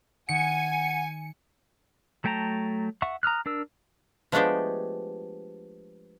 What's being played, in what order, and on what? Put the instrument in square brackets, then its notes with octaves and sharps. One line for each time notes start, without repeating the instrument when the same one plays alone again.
[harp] D#3 D7 [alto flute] F#5 [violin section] G#5 [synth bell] C#7
[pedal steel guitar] F#3 A3 G5 A5 A#5
E5 F#5 C#6
A#5 D#6 F6 F#6
D4 A#4 E6
[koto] F3 G#3 A3 B3 D4 G4